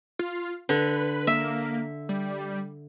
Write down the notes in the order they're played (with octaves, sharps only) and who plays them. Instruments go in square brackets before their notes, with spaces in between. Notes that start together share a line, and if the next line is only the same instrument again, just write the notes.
[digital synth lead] F4
[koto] D3 [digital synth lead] B4
[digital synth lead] A#3 [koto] E5
[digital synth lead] G3